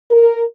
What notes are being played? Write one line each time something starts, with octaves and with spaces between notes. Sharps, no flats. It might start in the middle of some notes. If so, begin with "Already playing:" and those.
A#4